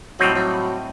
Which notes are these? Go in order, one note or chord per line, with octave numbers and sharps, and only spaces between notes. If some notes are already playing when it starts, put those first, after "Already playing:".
A2 F#3 G3 C4 D#4
F#3